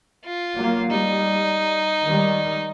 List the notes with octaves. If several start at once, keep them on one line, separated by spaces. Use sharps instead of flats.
F4
F#3 A#3
G3 D#4
D#3 G3